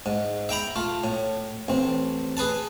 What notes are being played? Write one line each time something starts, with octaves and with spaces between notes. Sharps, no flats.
G#2
E5 G5 A#5 B5
A3 F4
A2
A1 C4
G#4 B4 G#5 A5